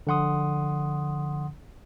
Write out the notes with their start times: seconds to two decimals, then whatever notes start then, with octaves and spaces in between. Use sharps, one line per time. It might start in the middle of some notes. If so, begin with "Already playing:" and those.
0.07 D3 F3 F#5 C6 D#6